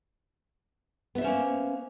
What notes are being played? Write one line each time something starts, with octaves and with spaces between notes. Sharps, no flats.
A#3 B3 C#4 C5 E5